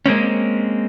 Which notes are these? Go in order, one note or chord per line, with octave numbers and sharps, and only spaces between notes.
G#3 A#3 C4 C#4